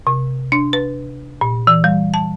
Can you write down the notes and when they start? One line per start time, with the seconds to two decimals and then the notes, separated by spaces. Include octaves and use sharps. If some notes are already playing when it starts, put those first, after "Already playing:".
0.07 C3
0.52 D4
0.73 B4
1.41 A#2
1.67 E3
1.84 G3
2.14 A5